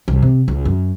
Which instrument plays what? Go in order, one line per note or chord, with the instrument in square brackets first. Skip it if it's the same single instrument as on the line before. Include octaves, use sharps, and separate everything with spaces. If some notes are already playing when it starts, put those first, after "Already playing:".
[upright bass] C2
C3
C#2
F#2